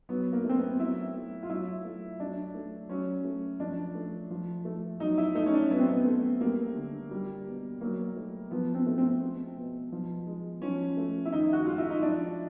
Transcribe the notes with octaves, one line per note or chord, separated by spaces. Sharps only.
F#3 B3
A#3
A3
C4
B3
F#3 E4
A3
F4
F#3 E4
A3
F#3 D4
A3
F#3 C#4
A3
F3 D4
A3
F3
A3
F#3 D#4
E4
A3 D#4
C#4
D4
F#3 B3
C4
B3
A3
G3 A#3
D3
G3
B2
F#3 A#3
A3
F3 B3
C4
A3
C4
G#3
B2
F3
G#3
F3 C#4
A3
E4
D#3 D#4
F#4
G#3 F4
E4
D#4
F3 D4